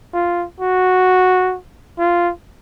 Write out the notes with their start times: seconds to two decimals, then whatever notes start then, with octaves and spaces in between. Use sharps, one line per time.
0.14 F4
0.60 F#4
1.99 F4